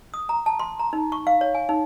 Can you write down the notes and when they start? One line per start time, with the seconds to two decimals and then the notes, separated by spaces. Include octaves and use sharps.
0.14 D#6
0.29 A#5
0.46 A5
0.59 C6
0.79 A#5
0.93 D#4
1.12 C#6
1.27 F5
1.41 C#5
1.54 G#5
1.69 D#4